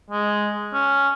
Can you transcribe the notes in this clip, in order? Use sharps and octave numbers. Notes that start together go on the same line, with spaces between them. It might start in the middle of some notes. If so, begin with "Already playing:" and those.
G#3
C#4